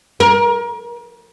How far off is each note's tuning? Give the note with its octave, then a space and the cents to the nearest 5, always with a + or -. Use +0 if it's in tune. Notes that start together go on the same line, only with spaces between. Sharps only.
A#4 +35